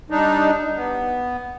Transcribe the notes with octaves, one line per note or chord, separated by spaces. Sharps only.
G3 D4 D#4
B3